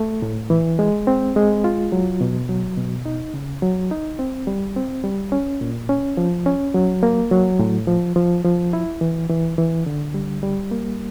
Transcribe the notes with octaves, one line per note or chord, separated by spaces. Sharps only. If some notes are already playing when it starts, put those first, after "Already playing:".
Already playing: A3
A2
E3
G#3
C4
G#3
F4
F#3
B2
F#3
B2
D#4
C#3
F#3
D#4
C4
G3
C4
G3
C#4
A#2
C#4
F3
C#4
F#3
A#3
F#3
A2
F3
F3
F3
E4
E3
E3
E3
D3
G3
G3
A#3